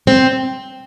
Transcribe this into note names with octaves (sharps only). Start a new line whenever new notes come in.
C4